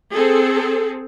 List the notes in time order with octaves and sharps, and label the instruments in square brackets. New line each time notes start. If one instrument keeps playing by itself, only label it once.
[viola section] C4 G#4 A4